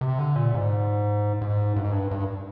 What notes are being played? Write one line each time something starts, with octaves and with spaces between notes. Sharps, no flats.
C3
D3
A#2
G#2
G#2
G2
G#2
G2
G2